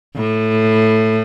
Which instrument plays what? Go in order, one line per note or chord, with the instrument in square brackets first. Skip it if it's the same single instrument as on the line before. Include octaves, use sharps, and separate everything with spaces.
[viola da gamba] A2